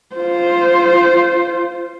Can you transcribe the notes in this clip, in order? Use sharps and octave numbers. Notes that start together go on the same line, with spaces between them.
F4 C5